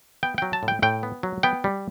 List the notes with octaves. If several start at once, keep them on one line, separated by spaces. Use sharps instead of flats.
B3 G5
F#3 G5
A5
A2
G5
A2 G5
B3
F#3
B3 G5
G3